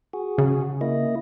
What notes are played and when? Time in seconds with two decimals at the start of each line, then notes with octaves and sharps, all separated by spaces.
0.13 F#4 G#4
0.38 C#3
0.81 A#3 E4 D#5